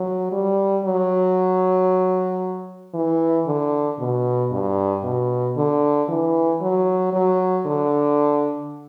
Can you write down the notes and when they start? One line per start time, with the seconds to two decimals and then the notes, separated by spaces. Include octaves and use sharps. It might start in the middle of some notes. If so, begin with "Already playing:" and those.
Already playing: F#3
0.32 G3
0.85 F#3
2.94 E3
3.46 D3
3.99 B2
4.51 G2
5.04 B2
5.56 D3
6.09 E3
6.61 F#3
7.13 F#3
7.66 D3